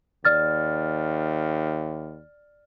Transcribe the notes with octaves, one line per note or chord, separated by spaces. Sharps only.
D#2 D5 F6 A6